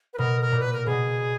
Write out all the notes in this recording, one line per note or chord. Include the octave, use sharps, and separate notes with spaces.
B4
B2 A#4
A#4
A#2
B4
A#4
B2 G#4